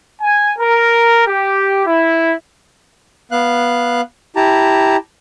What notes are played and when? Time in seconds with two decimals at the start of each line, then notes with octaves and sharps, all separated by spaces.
0.20 G#5
0.59 A#4
1.27 G4
1.86 E4
3.31 B3 F5 F#6
4.36 E4 G4 A5 A#5